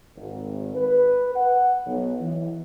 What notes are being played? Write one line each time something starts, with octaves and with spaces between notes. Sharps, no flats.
G#1
B4
F#5
B1
E3